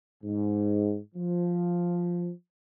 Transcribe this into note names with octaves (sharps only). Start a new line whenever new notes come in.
G#2
F3